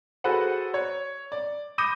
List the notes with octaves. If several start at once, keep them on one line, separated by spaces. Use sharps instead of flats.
F#4 G#4 A4 B4 C5 F#5
C#5
D5
B5 D6 D#6 G6 A#6 D#7